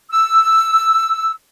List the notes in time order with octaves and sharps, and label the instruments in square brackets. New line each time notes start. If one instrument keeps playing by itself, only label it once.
[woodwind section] E6